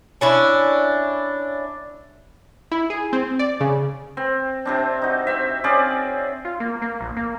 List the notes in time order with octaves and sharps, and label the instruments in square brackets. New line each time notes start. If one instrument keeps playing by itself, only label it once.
[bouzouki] C#4 D4 E4
[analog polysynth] E4
G#4
C4
D5
C#3
[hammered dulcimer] C4
C3 C4 D4
D#4 F#4
C4 E5
C4 C#4 G#4 D5
[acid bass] F4
A#3
A#3
A#1
A#3